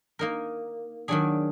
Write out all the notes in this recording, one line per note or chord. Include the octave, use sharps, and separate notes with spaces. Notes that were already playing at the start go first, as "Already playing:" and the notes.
A#3 D#4 A#4
D#3 F#3 D4 G#4